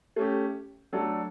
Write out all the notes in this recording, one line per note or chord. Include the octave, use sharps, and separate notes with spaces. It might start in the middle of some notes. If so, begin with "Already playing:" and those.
A3 C#4 G4
F#3 A3 D4 A4